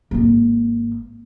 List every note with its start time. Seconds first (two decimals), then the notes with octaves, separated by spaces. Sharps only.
0.11 G#1 A#3